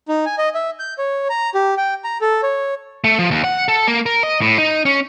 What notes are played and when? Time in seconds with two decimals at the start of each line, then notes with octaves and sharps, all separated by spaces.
0.08 D#4
0.26 G#5
0.38 D#5
0.54 E5
0.79 G6
0.98 C#5
1.30 A#5
1.55 G4
1.77 G5
2.04 A#5
2.21 A4
2.43 C#5
3.04 A3
3.19 F3
3.31 D#2
3.44 F#5
3.68 A4
3.87 A#3
4.06 A#4
4.23 D#5
4.41 A2
4.58 D#4
4.85 C#4